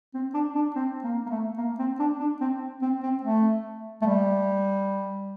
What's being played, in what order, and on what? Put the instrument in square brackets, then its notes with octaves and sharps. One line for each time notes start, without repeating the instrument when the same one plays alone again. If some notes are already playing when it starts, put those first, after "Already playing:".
[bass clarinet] C4
D4
D4
C4
A#3
A#3
A3
A#3
C4
D4
D4
C4
C4
C4
A3
A3
G3